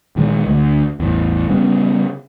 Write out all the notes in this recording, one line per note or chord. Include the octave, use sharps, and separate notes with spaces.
A#1 D#3 G#3
D2
A1 E2
C#3 G3 B3 C#4